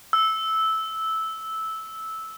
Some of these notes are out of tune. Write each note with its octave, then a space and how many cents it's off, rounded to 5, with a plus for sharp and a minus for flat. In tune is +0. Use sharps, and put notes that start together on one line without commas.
E6 -10